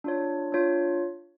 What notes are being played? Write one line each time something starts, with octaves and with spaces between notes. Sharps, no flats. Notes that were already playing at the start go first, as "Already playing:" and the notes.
D4 F4 C#5
D4 F4 C#5